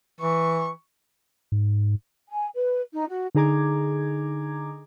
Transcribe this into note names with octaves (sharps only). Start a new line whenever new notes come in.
E3 C#6
G#2
G#5
B4
D#4
F#4
D3 D#4 G#4 A#5 D6 G#6